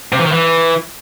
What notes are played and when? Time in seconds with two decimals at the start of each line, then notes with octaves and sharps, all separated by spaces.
0.13 C3
0.19 E3
0.26 D#3
0.32 E3